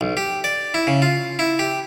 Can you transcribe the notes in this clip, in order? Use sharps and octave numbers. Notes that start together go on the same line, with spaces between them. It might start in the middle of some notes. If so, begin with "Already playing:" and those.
B1
G4
D5
E4
C#3
F4
E4
G4